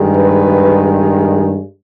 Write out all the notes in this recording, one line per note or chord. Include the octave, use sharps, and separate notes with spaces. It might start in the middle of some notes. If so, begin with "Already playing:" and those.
Already playing: G2 D#3 G#3
B4